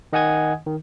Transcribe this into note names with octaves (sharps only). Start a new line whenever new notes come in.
D#3 D#5 F#5 G#5 D#6 G#6
D#3